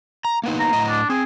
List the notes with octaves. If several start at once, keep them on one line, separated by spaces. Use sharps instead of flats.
A#5
A#3 B3 D#4
A#5
A2 D#5
D4
C4 G#4